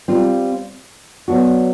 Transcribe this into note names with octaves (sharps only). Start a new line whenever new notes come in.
G3 C4 F4
F#3 B3 D4 F#4